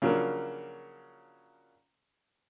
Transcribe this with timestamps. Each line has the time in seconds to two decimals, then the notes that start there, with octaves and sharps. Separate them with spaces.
0.02 C#3 F3 F#3 A#3 D4